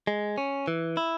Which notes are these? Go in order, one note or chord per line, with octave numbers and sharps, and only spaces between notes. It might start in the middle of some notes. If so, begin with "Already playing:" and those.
G#3
C#4
E3
E4